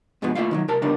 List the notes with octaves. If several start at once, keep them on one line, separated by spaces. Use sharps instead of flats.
G2 B2 F3 G#3 B3
A3 A#3 C#4 E4 F4 F5
D#3 E3 F#3
C2 A#4 A5
C#3 G3 B3 D4 A#4